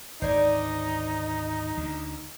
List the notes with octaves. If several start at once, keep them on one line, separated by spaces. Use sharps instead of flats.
G#1 D2 D#4 C5 D5 G#5
D2 D3